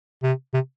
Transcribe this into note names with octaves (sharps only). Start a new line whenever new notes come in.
C3
C3